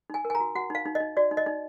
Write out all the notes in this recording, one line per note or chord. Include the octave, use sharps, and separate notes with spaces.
D#4 G#5
A#4
G#5
A#5
F#4
F#4 F#5
D#4 F5
D#4
D#5
D#4
F#4 D5
D#4
D#5
D#4